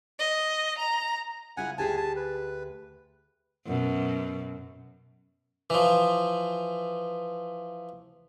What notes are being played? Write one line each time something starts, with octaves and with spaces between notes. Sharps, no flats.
D#5
A#5
C#3 E4 F4 F#5 G#5
D2 G4 G#4 G#5 A5
A5
B4
F#2 B2
E3 F3